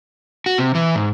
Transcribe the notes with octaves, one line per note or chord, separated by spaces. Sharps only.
F#4
C3
E3
G#2